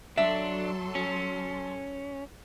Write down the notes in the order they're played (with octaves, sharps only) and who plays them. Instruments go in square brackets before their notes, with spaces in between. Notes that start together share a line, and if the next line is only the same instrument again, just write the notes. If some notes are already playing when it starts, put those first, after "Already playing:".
[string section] F#3 A4 C6 [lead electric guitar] D4 [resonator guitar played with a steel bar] E5
[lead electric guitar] C#4